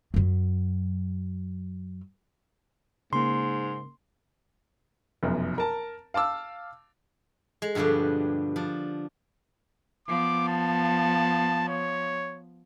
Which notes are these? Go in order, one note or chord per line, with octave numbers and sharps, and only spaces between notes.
F#2 F#3
G#2 C#3 A#3 C6
F1 F#2 B2
A#4 A5
F5 A5 D6 E6
G#3
G2 B2 D3 F3 G4
F3 D4
F3 B3 D6
A5
C#5